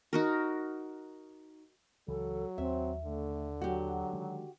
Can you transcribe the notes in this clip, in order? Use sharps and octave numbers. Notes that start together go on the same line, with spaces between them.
D#4 F#4 A#4
C#2 C#3 E3 F#3 A4
D#2 C4 E5
D3 A3
F#3 F#4 G4
D#3 G#3